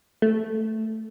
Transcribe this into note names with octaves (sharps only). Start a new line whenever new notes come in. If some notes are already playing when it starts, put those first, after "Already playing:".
A3